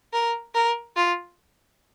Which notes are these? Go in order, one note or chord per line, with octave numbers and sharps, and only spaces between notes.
A#4
A#4
F4